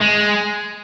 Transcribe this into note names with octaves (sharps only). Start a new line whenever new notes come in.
G#3